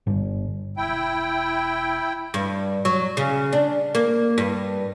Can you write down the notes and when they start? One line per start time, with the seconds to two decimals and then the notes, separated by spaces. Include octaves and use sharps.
0.07 G1
0.77 E1 E4 G5
2.34 G2
2.85 F#3
3.17 C#3
3.53 D4
3.95 A#3
4.38 G2